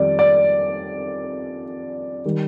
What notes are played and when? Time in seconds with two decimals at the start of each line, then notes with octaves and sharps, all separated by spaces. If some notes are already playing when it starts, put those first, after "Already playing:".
Already playing: F2 D#3 G3 D5
0.19 D5
2.25 D#3 G3